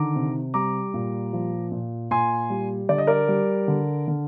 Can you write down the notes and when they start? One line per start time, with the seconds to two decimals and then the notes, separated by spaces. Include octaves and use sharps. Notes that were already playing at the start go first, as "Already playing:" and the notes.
Already playing: D3 D#3 A#5 D6
0.16 C3
0.54 G3 A#5 D6
0.94 A#2
1.33 F3
1.72 A#2
2.11 A#2 G#5 C6
2.50 G3
2.89 D3 D5
2.98 D#5
3.07 A#4 D5
3.28 G3
3.68 D3
4.08 D3